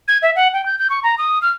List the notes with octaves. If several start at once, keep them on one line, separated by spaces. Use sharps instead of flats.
G#6
E5
F#5
G5
G6
G6
C#6
A#5
D#6
F6